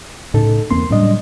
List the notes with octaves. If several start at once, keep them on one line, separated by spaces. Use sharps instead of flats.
A2 C#3 D#4 A4
E2 A#3 C4 C6
A2 C#3 F#3 G3 D4 D#5